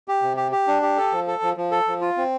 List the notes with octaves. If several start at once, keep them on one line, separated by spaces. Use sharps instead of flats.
G4
C3
G4
G4
D4
G4
A4
F3
A4
F3
F3
A4
F3
F4
C4